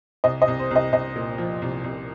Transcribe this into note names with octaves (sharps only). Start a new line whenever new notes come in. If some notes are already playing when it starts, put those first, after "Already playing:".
C2 D#5
D#5
C2
C5
C2
D#5
C2 D#5
A#2
F3
C2
C2